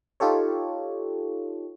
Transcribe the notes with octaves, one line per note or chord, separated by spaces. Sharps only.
D#4 F4 G4 A4 C#5